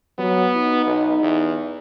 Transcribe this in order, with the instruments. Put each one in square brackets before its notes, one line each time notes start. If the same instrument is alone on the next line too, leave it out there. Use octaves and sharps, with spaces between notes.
[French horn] F#3 [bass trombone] B3
[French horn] D#4
[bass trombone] B1
E2